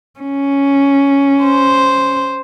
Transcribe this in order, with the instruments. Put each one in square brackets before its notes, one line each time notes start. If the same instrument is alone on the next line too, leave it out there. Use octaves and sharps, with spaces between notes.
[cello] C#4
[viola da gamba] C5